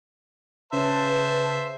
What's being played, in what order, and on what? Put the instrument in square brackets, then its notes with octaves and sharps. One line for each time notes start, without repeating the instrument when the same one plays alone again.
[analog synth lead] C#3 [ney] B4 [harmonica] C5 E5 [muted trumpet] A5